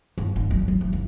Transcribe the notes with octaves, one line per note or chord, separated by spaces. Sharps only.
G1
G#1
F#2
F#2
E3
F#1